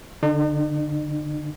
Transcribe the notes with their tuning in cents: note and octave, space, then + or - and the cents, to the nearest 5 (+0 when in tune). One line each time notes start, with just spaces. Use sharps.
D3 +0 D#4 -45